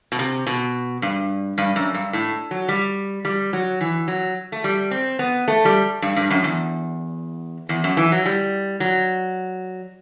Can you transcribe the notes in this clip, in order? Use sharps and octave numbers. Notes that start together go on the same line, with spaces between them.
B2
C3
B2
G2
G2
F#2
G2
A2
F#3
G3
G3
F#3
E3
F#3
A3
G3
C4
B3
A3
G3
G2
G2
F#2
E2
E2
F#2
E3
F#3
G3
F#3